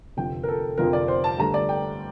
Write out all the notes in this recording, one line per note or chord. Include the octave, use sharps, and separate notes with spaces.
F1 F2 D3 F3 G5
A#4
A4
F1 F2 D3 F3 A#4
D5
C5
A5
G2 D3 A3 A#5
D5
G5